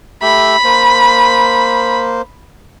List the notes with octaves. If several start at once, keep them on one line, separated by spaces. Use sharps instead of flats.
A3 G4 E5 B5
A#3 C5